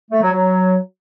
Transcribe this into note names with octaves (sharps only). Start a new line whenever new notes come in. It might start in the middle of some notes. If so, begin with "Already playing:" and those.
A3
F#3
F#3